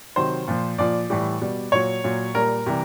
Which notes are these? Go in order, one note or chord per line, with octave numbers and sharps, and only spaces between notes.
C3 D#3 F#3 C5
A#2 F3
A#2 F3 D5
A2 E3 G3
B2 G3
A#2 F#3 C#5
A#2 F#3
A#2 G3 A#4
C3 E3 G3